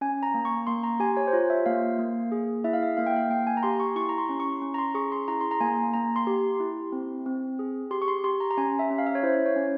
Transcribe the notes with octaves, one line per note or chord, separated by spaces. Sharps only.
C#4 G#5
A#5
A#3
C#6
A#3 C6
A#5
G4 G#5
C#5
C5
F4 C#5
E5
A#3 F5
A#3
G#4
E4 E5
F5
E5
A#3 F5
G5
F5
A#3 G5
G#5
A#5
G4 C6
C#6
E4 C#6
A#5
C6
C#4
C#6
C#4
A#5
C6
G#4 C#6
C6
E4 A#5
C6
A#5
A#3 G#5
A#3 A#5
C6
G4
E4
C4
C4
G#4
G4 C6
C#6
C6
G4 C6
A#5
A#5
C#4 G#5
E5
C#4
F5
E5
C#5
E4 C5
C#5
C#4